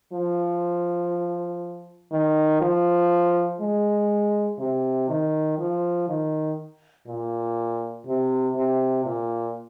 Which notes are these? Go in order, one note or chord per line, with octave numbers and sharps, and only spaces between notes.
F3
D#3
F3
G#3
C3
D#3
F3
D#3
A#2
C3
C3
A#2